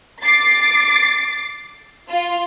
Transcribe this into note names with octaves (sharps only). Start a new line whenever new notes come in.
D6 A6 C7
F4